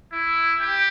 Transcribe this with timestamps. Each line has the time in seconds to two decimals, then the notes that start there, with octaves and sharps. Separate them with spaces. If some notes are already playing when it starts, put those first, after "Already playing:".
0.13 E4
0.60 G4